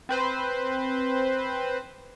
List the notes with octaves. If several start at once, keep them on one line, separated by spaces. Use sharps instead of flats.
C4 B4 C5